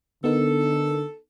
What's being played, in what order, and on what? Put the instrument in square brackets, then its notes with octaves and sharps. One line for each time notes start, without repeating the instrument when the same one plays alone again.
[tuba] D3 [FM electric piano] B3 D#4 A#4 [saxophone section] A4